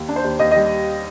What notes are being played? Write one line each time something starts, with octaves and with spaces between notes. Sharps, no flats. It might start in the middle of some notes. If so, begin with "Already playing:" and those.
Already playing: D#2
D4
C5
D#2
D#2 D#5
G3 D#5